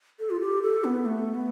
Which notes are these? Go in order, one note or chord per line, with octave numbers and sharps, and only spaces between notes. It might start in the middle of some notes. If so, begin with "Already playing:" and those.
A4
F4
G4
A4
B3
A3
B3